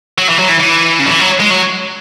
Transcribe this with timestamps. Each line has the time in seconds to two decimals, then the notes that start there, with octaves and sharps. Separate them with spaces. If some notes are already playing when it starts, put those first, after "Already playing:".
0.18 F#3
0.29 E3
0.39 F#3
0.49 E3
0.59 E3
0.99 C#3
1.06 F#3
1.10 E3
1.20 F#3
1.40 G#3
1.51 F#3